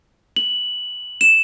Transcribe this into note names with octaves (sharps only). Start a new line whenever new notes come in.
F#7
E7